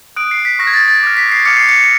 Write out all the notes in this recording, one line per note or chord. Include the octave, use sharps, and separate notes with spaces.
D#6 F#6 D7
C7
B6
C#6 F6 A#6
G#6
A6
A6
D6 F6
B6
C7
D6 F6 C#7
C7
C#7